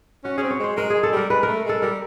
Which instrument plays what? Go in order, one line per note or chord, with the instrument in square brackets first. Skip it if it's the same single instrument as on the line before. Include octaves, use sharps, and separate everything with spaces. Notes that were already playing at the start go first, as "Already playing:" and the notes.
[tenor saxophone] C#4 [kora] F#4
[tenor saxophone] C#4 [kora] G#4
[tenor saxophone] C4
[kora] C#5
[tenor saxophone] G#3 [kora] C5
[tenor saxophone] G#3 [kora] A#4
[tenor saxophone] G#3 [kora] G#4
[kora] A4
[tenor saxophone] G3 [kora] A#4
[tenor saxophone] G#3 [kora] B4
[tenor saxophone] A3 [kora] A#4
[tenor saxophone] G#3 [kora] A4
[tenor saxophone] G3 [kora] A#4